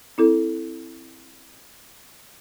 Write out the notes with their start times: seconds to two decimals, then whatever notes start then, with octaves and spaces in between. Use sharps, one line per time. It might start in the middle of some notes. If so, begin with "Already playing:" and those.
0.18 C4 E4 A4